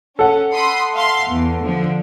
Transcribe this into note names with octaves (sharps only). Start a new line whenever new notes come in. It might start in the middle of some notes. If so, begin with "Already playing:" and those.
C#4 A4 F#5
B5 C6 D#6
E5 F5 C6
E2
D3 F3